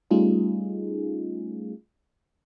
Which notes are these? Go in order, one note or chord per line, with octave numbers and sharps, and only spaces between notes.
G3 A3 C#4 D#4 F4 G#4